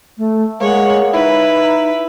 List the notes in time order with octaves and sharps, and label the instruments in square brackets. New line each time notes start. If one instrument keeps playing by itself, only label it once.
[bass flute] A3
[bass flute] G#3 [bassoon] A#3 [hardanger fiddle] C#5 F#5
[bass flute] D#4 [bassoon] E4 [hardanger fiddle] B4